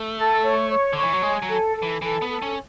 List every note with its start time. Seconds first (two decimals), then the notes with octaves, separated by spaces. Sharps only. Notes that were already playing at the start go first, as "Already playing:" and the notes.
Already playing: A3
0.16 A4
0.43 C#5
0.69 C#5
0.93 D3 C#5
1.03 E3
1.13 F#3
1.22 G#3 G#5
1.42 F#3
1.49 A4
1.75 A4
1.82 E3
2.02 E3 A4
2.22 B3
2.29 A4
2.42 C#4